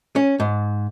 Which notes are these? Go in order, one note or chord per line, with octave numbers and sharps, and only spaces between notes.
C#4
G#2